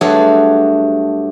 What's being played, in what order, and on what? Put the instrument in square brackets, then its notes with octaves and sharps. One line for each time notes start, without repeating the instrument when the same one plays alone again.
[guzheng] G2 F#3 A3 G#4 A4